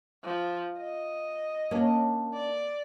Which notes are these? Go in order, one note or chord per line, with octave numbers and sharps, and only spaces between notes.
F3
D#5
A#3 C#4 D4
D5